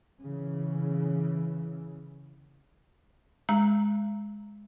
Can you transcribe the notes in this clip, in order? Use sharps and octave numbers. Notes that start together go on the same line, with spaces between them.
C#3 E3
G#3 A#5